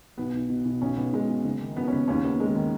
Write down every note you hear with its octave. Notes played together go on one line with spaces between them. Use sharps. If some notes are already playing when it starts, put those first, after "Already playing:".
B1 B3
B1
B2
B2
B1 C#4
B1 B3
B2 G#3
B2
F#1
D#3
F#2 B3
C#4
F#1 B3
D#2 C#4
D#2 B3
D#3 G#3
D#3